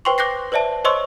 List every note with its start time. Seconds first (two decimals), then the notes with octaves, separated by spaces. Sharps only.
0.05 B4 C5 G5 C6 C#6
0.18 D6 F#6 G6 A#6 C7
0.52 B4 C5 D5 E5 A5
0.85 C5 C#5 D#5 C6 C#6 E6